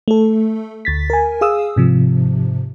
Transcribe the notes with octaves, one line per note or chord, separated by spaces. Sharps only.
A3 A4
D2 A6 B6
A#4 G#5
G#4 F5 D#6 E6
G#2 C3 F3